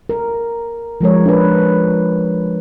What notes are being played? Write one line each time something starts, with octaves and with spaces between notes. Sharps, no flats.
A#4
F3 G#3 A#4 C#5
D4 B4